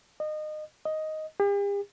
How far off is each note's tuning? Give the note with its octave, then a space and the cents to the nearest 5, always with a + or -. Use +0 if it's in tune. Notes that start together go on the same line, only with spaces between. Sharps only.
D#5 -25
D#5 +5
G4 +45